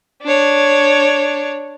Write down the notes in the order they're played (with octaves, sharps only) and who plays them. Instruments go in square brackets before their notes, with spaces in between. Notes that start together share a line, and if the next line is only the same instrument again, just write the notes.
[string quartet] D4 C#5